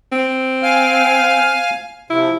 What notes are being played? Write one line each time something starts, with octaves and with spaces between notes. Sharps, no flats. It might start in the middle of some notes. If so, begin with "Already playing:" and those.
C4
F5 G#5 F6
C3 F3 E4